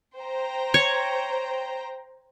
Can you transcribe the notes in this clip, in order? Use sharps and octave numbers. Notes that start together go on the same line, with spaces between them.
C5 G5 A#5
C#5